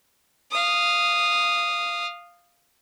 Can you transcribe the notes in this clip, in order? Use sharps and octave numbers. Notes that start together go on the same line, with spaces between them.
F5 D#6